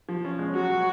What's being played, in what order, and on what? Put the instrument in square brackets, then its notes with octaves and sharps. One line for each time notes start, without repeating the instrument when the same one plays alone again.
[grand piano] F3
C#4
G#3
[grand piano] F#3 [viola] F#4
[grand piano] F#3